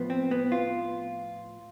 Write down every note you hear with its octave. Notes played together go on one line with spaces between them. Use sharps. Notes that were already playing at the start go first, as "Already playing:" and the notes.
Already playing: A2 F3 B3
C4
B3
F4